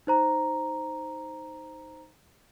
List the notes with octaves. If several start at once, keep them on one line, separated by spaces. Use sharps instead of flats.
D#4 C5 A#5